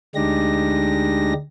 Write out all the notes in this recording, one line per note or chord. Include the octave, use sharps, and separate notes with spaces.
D2 G#3 D4 D#4 G4 A#6